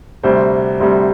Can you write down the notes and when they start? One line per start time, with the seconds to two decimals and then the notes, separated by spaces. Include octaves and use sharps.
0.23 D2 C3 G3 C5
0.80 D2 C3 G3